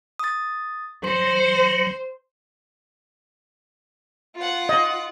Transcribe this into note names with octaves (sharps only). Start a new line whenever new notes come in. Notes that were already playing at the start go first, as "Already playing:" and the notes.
D#6 A6
F#3 C5 C6
F4 F#5
D#5